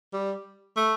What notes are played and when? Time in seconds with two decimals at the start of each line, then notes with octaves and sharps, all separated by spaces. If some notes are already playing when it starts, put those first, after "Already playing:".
0.13 G3
0.77 A3